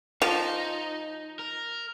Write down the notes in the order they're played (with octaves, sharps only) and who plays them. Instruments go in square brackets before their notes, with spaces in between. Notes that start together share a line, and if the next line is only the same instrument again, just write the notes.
[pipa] F3 [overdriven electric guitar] D#4
[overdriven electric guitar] A#4